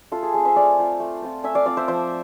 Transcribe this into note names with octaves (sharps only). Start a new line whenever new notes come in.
A3 F4 A4
G#4
C4 F4 G#4
C5 E5
A3 D5 F5
C4 F4
A3
C4 F4
A3 E5 G#5
D5 F5
C4 F4 D5 F5
C5 E5
F3 C5 E5